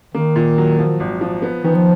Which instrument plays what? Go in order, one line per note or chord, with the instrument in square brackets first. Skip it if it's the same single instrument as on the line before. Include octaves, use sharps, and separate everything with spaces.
[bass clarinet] D#3 [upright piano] A#3
[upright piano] A#2
F#3
F3
G#1
F3
B3
[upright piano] D#3 [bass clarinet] E3
[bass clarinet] F3